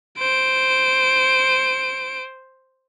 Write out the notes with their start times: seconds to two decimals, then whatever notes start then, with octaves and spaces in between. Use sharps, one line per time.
0.19 C5 D7